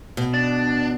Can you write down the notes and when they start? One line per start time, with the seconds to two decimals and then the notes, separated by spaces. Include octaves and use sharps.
0.17 B2
0.34 D4